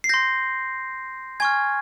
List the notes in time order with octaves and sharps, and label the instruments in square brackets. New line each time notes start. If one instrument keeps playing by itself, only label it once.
[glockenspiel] C7
C6 G6 A#6
G#5 C#6 F6 G#6